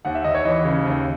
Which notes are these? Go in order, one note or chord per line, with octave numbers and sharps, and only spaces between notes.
D#2 F#5
E5
D#2 D#5
C#5
E3 D#5
C#3
D#2